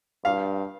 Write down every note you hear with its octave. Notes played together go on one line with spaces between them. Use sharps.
G2 F5